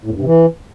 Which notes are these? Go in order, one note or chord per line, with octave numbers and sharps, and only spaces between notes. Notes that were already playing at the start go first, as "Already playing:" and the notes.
A2
E2
G2
C3
E3